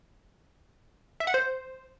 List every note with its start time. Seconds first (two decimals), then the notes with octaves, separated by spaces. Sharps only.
1.20 E5
1.27 F#5
1.34 C5